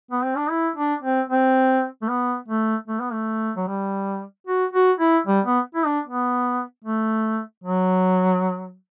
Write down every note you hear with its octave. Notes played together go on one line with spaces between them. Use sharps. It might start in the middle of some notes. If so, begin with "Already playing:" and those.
B3
C4
D4
E4
D4
C4
C4
A3
B3
A3
A3
B3
A3
F#3
G3
F#4
F#4
E4
G3
B3
E4
D4
B3
A3
F#3